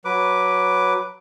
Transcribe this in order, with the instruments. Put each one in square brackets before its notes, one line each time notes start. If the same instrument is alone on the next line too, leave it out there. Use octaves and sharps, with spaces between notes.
[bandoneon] F#3 B4 D6